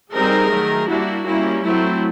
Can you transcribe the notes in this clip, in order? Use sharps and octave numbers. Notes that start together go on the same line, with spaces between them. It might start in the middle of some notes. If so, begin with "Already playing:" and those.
G3 C4 D#4 G#4 A#4
D#3 F#3 A3
G3 A#3 D4 E4 F#4
G3 A#3 C#4 E4
F#3 A3 C4 E4